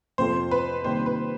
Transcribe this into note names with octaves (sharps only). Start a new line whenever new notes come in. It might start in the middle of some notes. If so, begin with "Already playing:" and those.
F2 C3 F3 A3 C5
B4
C3 D#3 G3 A#3 C5
B4